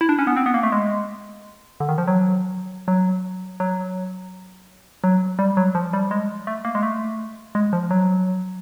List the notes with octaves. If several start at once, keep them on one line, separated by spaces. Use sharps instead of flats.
E4
D4
C#4
B3
C4
B3
A#3
A3
G#3
D3
D#3
F3
F#3
F#3
F#3
F#3
G3
F#3
F3
G3
G#3
A3
A#3
G#3
A3
G#3
F3
F#3